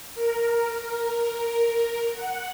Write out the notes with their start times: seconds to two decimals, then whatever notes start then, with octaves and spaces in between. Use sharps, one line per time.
0.15 A#4
2.13 F#5